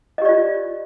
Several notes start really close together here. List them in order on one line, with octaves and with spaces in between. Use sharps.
D#5 G4 D5 F4